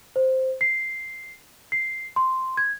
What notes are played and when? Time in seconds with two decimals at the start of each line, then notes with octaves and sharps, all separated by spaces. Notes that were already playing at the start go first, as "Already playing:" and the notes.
0.16 C5
0.61 C7
1.72 C7
2.16 C6
2.57 G#6